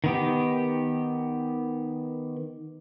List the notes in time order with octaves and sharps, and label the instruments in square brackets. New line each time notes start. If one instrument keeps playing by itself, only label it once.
[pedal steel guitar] D#3 B3 G4